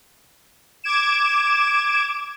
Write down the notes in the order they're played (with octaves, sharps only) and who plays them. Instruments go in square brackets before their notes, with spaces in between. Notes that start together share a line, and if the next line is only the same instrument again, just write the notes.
[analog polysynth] D6 G#6 D7 E7